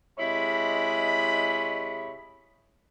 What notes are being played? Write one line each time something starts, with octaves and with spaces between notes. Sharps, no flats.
C3 G#3 E4 C#5 D#5 B5